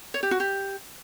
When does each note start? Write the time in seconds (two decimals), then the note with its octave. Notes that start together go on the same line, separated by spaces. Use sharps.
0.14 C#5
0.23 G4
0.31 F#4
0.40 G4